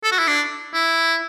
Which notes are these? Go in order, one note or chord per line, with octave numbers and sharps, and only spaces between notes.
A4
F#4
E4
D4
E4